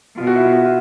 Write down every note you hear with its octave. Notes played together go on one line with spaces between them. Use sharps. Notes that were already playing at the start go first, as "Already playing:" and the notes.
B2 F4
F#4
E4
F4
F#4
F4